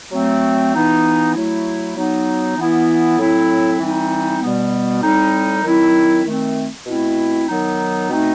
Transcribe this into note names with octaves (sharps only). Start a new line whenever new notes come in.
F#3 A3 C4
E3 B3 D#4
F#3 A3 E4
F#3 B3 D#4
E3 B3 E4
A2 F#3 C4 E4
E3 G3 C4 D#4
B2 G3 B3
A2 G3 C4 D#4
D#3 F#3 C4 E4
D#3 A3 C4
B2 A3 C4 E4
D#3 F#3 B3 D#4
B2 A3 C4 D#4